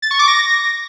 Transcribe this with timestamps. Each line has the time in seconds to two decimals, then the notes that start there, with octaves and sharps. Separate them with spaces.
0.02 A6
0.11 C#6
0.19 D6
0.28 A#6